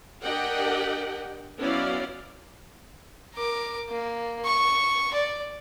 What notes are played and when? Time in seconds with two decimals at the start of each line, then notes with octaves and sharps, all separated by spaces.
0.23 D4 G4 A#4 D#5 F#5 G5
1.60 F#3 B3 C#4 E4 D5 F5
3.35 A#4 D6
3.89 A#3
4.45 C#6
5.14 D5